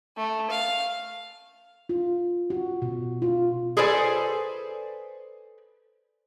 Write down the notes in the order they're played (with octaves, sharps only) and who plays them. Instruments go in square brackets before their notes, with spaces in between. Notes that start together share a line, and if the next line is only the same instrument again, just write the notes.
[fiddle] A3
F5
[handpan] F4
F#4
B2
F4
[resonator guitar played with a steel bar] G#4 A4 B4 C5 D5 G#5